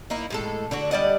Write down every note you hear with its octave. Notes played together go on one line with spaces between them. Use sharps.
A#3 D#4 E4
A2 G#3 A4
D3 D4 F#4
G3 D5 D#5 F#5